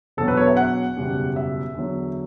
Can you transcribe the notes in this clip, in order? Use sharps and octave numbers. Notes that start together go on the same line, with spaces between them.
E1 E2 B2 F#3 A4
B4
C#5
E5
F#5
F#1 E2 B2 G3
E5
E2 D3 F#3